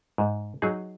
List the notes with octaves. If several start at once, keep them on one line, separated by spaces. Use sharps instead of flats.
G#2
F#3 D#4 G#4